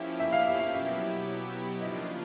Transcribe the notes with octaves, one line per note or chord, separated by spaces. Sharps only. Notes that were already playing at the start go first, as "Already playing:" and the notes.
Already playing: F3 A#3 C#4 E4 G4 E5
E5
F5
E5
F5
B2 F#3 B3 E4 G4 E5
C#3 F3 A#3 D4 F4 D#5